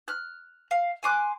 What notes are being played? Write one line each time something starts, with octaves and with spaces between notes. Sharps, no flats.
F6 F#6
F5
G#5 C6 D6 F#6